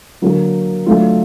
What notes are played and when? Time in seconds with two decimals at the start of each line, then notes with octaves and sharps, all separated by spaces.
0.22 D3 F#3 A#3
0.86 F#3 A3 D4 F4